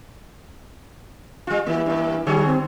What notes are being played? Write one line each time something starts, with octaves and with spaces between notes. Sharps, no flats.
G3 F4
E3 A#3
G2 A#3
D3 G3 G#4 C#5
C4